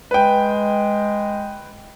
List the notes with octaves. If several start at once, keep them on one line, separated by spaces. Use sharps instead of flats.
G#3 B4 G5